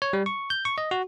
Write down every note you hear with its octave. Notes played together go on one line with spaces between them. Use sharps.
C#5
G3
C#6
G6
C#6
D#5
F#4